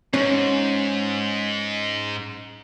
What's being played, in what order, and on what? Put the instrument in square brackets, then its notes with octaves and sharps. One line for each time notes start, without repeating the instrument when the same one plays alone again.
[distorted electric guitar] G#2 [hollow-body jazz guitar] C#4